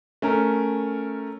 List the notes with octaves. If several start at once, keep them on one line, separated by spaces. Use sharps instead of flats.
A3 C#4 A#4